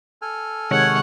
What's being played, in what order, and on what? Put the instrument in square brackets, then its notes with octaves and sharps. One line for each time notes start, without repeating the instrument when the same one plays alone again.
[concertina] A4 G#5 F6
[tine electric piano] C3 D#3 G#3 [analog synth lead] C#5 [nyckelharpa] F#5